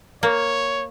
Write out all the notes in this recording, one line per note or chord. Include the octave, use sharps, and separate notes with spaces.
A#3 C#5